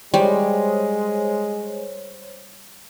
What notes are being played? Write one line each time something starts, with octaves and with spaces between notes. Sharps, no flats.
G3 G#3 C5 C#5